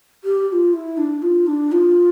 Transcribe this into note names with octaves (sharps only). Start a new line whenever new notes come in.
G4
G4
F4
E4
D4
F4
D4
F4